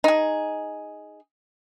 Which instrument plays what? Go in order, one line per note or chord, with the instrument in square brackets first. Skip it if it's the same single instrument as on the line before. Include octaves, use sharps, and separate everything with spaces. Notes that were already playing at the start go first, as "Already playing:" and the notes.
[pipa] D#4 G#4